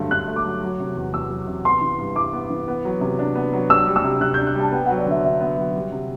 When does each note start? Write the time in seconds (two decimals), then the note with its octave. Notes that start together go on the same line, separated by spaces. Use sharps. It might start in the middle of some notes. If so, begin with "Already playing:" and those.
Already playing: G2 D3 F#3 A3
0.11 G2 F#6
0.27 A3
0.36 D6
0.45 F#3
0.63 F#3
0.80 C3
0.96 E2
1.13 E2 E6
1.30 F#3
1.47 C3
1.65 B3 C6
1.81 E3
1.99 G2
2.16 E4 D6
2.33 B3
2.50 E3
2.68 B3
2.85 F#3
3.01 C3
3.19 D4
3.35 B3
3.53 F#3
3.70 D4 E6
3.87 G3
3.96 E6
4.04 C3
4.21 C3 F#6
4.34 D4 G6
4.47 F#6
4.55 G3 A5
4.72 B3 G5
4.86 F#3 F#5
4.98 D5
5.06 D3 E5
5.23 D3 E5
5.40 B3
5.57 F#3
5.75 G3
5.92 C3